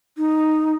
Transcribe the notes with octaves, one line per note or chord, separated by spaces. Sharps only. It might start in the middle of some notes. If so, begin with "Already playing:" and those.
D#4